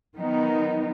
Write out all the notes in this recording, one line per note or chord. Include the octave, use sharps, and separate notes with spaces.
D#3 F#3 B3 D#4